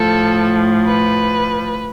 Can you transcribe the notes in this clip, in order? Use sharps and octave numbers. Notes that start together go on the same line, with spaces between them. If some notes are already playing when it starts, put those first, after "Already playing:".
Already playing: A2 F3 A4
B4